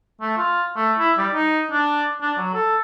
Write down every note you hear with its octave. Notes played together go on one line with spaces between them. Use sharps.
A3
F4
A3
E4
G3
D#4
D4
D4
F#3
A4